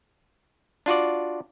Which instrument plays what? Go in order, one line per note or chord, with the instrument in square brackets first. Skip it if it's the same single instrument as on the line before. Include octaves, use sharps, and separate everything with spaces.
[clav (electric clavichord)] D4 F4 F#4 D5